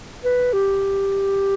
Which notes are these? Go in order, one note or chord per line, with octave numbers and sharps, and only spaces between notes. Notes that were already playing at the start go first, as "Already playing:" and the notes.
B4
G4